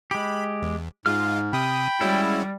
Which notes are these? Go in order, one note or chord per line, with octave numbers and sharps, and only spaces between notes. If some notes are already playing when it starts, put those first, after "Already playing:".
G#3 G4 B5
E2
G#2 G#3 F4 F6
C3 G5 B5 D#6
G3 G#3 C#4 E4 F#4